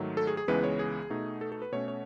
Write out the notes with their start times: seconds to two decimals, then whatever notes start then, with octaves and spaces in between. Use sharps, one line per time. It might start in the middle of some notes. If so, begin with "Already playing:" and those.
Already playing: G#2 D#3 F#3 A3
0.17 A4
0.27 G#4
0.37 G#4
0.48 C#2 C#3 E3 G#3 B3 B4
0.64 C#5
0.79 G#4
1.10 B2 A3 D#4
1.41 A4
1.52 A4
1.62 B4
1.72 B2 A3 C#4 C#5
1.88 C#5